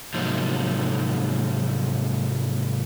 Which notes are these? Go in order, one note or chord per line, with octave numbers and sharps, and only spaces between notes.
G#2 C3 F3 F#3 A#3 D#4